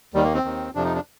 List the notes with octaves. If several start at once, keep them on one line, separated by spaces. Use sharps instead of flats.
D#2 D#3 G3
A#3
C4
D#2 D#3
F2 C3 F3 D4
D#4
D4